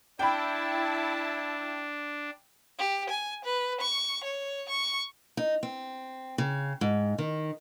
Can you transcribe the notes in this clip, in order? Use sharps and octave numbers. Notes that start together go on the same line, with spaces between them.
D4 E4 G5 A5 B5
G4
G#5
B4
C#6
C#5
C#6
D#4
C4
C#3
G#2
D#3